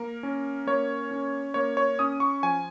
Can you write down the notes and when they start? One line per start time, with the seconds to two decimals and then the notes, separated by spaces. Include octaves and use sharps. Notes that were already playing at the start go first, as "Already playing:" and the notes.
Already playing: A#3 A#4
0.23 C#4
0.67 A#3 C#5
1.11 C#4
1.54 A#3 C#5
1.77 C#5
1.99 C#4 D#6
2.20 C#6
2.43 F3 G#5